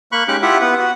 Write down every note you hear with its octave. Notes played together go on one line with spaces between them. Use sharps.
A#3 B5 C#6 F#6
G#3 C#4 D#4 G4 D6 F#6
E4 F4 G4 E5 F#5
B3 B4 F#5
F#4 F#5